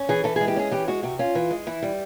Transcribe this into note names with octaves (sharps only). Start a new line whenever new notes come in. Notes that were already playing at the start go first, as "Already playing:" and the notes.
Already playing: C#4
E3 G#4
E3 A4
G#4
G#3
G4
C#4 G#4
E3 G4
G#3 F#4
C3 F#4
C#4 F4
E3
G#3
E3 E4
G3